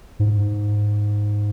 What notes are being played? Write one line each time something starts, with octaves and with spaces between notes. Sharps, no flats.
G#2